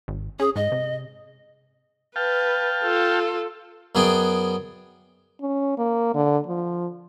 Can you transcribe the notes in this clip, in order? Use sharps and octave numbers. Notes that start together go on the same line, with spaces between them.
G#1
C#4 G#4
G#2 D#5
C3
B4 F5 G5 A5
F4 A4
F#2 F#3 B3 G#4 D5 G5
C#4
A#3
D3
F3